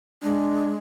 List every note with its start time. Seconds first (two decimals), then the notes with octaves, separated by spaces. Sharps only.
0.23 G#3 D4